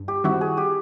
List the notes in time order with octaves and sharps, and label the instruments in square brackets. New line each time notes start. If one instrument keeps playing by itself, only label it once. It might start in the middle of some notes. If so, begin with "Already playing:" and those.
Already playing: [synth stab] G2
[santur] G4
[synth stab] D#3 G3 C4 E4 [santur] F#4
[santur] G#4
G4